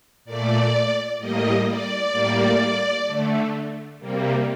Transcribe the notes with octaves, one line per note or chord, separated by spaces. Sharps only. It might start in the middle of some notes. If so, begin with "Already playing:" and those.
A#2 A3 D5
A2 G3 A#3 D#5
D5
A2 G3 A#3
D3 A3
C3 G3 A#3